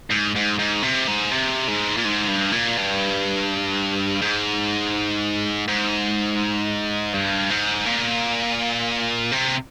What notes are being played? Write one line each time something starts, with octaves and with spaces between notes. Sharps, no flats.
G#2
G#2
G#2
C3
G#2
C3
G#2
A#2
G#2
G2
A#2
G2
G#2
G#2
G2
G#2
A#2
C3